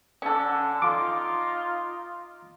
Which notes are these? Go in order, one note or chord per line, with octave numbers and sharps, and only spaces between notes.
D3 C#4 A4
D#4 F4 D6